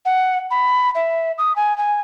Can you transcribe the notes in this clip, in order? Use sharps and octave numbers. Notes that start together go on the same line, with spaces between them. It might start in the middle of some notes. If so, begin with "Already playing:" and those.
F#5
B5
E5
D#6
G#5
G#5